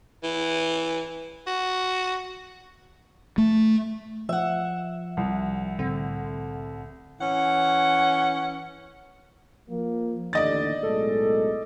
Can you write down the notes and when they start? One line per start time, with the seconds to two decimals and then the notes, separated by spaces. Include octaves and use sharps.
0.24 E3
1.47 F#4
3.38 A3
4.29 F3 E5 F#5
5.17 C2
5.79 A2 D3 C4
7.20 E3 C#4 F#5
9.70 F3 A#3
10.33 A1 D#2 D3 D5 D#5 A6
10.83 B1 A2 G#3 A4